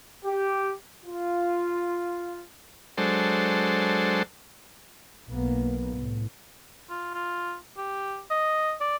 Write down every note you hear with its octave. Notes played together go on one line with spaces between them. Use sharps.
G4
F4
F#3 G#3 D4 A4 C5
B1 A#3 B3
C2 A2
F4
F4
G4
D#5
D5